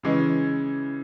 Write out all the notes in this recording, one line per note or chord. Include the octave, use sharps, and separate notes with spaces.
C#3 E3 G#3 C#4